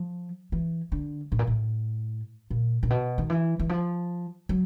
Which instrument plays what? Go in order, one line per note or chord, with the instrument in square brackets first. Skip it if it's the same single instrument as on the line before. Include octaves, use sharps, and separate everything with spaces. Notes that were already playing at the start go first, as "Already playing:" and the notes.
Already playing: [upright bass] F3
E3
D3
A2
A#2
A2
A#2
A#2
B2
D#3
E3
E3
F3
F#3